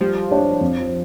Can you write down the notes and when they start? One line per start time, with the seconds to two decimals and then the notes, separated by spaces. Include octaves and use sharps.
0.01 F3 G3
0.31 D4 G4 C#5
0.61 F2